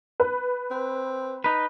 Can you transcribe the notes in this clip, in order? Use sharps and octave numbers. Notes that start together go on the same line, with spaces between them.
B4
C4
D#4 B4